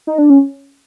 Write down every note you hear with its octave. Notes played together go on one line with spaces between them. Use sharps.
D#4
D4
C#4